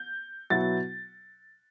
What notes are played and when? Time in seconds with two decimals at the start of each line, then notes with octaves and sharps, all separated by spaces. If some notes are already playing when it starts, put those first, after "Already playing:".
Already playing: G6
0.50 B2 F#3 B3 E4 A6